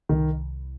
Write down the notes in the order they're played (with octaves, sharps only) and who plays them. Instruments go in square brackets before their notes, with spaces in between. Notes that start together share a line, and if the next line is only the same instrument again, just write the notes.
[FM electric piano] C2 [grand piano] D#3